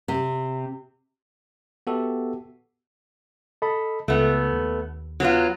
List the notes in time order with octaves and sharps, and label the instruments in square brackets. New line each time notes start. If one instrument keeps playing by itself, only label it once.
[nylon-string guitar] C3
[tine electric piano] B3 F#4 G4 A4 E5
[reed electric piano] A4 D#5 B5
[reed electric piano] C#2 C#3 [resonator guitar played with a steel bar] A3 B3
[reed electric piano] D#2
[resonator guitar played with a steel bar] F#3 B3 F4